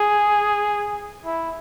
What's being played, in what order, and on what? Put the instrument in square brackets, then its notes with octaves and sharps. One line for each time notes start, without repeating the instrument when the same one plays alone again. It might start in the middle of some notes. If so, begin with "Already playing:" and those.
Already playing: [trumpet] G#4
E4